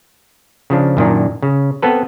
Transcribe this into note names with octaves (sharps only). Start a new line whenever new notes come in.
C#3 F3 D4
F#2 A#2 D#3 D4
C#3
B3 C4 A4 B4